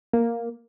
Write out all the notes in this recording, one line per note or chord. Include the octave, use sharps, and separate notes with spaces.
A#3